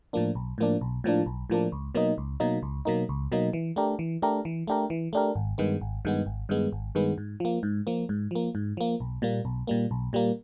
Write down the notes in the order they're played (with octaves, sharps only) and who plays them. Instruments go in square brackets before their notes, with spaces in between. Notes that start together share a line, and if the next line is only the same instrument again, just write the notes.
[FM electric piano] A2 F3 A#3 D4
B1
A2 F3 A#3 D4
B1
A2 F3 A#3 D4
B1
A2 F3 A#3 D4
C#2
B2 F#3 A#3 D#4
C#2
B2 F#3 A#3 D#4
C#2
B2 F#3 A#3 D#4
C#2
B2 F#3 A#3 D#4
E3
A3 D4 G4 A#4
E3
A3 D4 G4 A#4
E3
A3 D4 G4 A#4
E3
A3 D4 G4 A#4
G#1
G2 D#3 G#3 B3
G#1
G2 D#3 G#3 B3
G#1
G2 D#3 G#3 B3
G#1
G2 D#3 G#3 B3
G#2
F3 A#3
G#2
F3 A#3
G#2
F3 A#3
G#2
F3 A#3
B1
A#2 G3 A#3
B1
A#2 G3 A#3
B1
A#2 G3 A#3